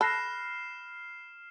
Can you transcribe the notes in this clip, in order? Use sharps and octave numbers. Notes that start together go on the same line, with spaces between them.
A4 B5 F6 F#6 A#6 C7 E7